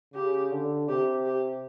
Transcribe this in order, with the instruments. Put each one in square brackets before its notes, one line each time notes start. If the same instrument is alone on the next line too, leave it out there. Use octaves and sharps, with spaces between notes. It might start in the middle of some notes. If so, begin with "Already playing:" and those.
[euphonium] C#3 [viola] G4
[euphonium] D3
[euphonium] C3 [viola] G4
[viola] G4